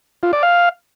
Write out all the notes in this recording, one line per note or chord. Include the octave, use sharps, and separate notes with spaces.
F4
D5
F5